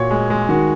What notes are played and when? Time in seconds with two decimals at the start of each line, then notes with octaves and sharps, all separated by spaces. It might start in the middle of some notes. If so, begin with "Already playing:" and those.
Already playing: A#2 F#4 C#5
0.11 G#3
0.30 G#3
0.49 D#3 F#4